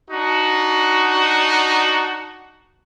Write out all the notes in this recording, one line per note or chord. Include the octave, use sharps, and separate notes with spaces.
D4 D#4 F#4